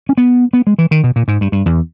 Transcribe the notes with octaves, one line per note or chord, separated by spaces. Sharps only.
C#4
B3
B3
G#3
E3
D#3
B2
A#2
G#2
G2
G2
E2